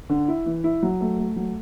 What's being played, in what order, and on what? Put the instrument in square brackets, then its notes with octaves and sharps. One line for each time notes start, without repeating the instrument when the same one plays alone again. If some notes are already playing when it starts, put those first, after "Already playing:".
[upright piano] D3
E4
E3
E4
F#3
A3
A3
F#3